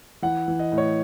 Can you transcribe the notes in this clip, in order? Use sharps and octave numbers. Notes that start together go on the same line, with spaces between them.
E3 F#5
E3
D#5
A2
C#5